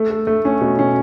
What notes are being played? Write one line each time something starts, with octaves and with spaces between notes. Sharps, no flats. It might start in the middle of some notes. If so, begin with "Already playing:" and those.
Already playing: A3
A4
A3
C#4
B2
C#4